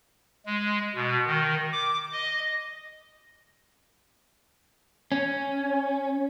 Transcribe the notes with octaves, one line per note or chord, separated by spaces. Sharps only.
G#3
B2
D#3
D6
D#5
C#4